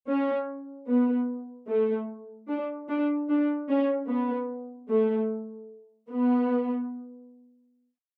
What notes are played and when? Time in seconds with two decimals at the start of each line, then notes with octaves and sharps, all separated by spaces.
0.08 C#4
0.88 B3
1.68 A3
2.48 D4
2.89 D4
3.29 D4
3.69 C#4
4.09 B3
4.90 A3
6.10 B3